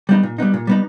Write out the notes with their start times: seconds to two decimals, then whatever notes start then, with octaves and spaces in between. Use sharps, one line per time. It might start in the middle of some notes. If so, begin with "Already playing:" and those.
0.09 G3 B3 D#4
0.23 A#2
0.38 G3 B3 D#4
0.54 A#2
0.67 G3 B3 D#4